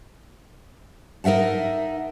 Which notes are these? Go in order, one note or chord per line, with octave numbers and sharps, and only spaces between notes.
D#4 A#4 E5 F#5 A5